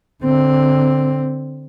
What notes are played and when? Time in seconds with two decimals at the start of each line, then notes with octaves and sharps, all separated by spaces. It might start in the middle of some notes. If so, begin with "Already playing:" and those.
0.23 D3 C4